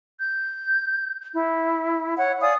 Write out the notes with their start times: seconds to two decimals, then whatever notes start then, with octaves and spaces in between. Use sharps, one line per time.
0.21 G6
1.33 E4
2.17 C#5 F#5
2.41 D5 F5 G#5 D#6